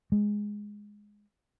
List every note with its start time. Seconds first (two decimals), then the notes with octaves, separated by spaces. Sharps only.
0.12 G#3